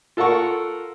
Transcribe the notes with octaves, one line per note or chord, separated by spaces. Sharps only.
F4 A4 A#4 F#5 C#6